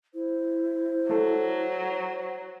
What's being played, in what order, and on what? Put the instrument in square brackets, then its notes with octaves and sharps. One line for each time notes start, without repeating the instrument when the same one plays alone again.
[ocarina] E4 [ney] C5
[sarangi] F#3 [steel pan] A3 A4